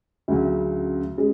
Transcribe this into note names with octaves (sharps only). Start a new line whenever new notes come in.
D2 C#3 F#3 C#4
G#3 C#4